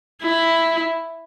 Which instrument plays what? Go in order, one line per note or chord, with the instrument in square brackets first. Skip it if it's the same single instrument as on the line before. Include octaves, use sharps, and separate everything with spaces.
[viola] E4